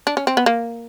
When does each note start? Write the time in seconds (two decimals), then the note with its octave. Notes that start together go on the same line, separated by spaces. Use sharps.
0.07 D4
0.17 C#4
0.27 C4
0.37 B3
0.46 A#3